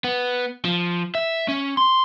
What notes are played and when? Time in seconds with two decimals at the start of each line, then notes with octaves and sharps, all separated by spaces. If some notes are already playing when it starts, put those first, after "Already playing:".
0.04 B3
0.65 F3
1.15 E5
1.48 C#4
1.77 C6